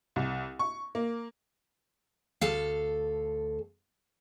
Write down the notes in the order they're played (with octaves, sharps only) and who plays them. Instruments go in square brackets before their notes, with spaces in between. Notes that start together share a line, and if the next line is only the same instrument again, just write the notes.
[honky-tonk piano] C2
C#6
A#3
[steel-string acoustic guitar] D2 A4 F5